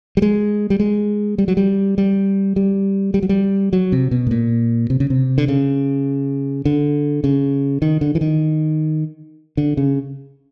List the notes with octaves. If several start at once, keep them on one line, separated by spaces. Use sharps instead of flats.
G3
G#3
G3
G#3
G3
F#3
G3
G3
G3
G3
F#3
G3
F#3
C3
B2
A2
A#2
C3
C#3
C3
D3
C#3
D3
C#3
D#3
D3
E3
D#3
D3
C#3